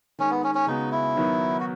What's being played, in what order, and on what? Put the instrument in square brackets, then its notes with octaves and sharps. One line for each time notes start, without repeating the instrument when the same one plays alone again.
[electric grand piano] D#3 G#3 D#4 [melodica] C#4
[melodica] B3
C#4
C#4
[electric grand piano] C#3 G#3 B3 F#4 [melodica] D#4
[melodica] E4
[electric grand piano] D#3 F#3 B3 D#4
[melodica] F#4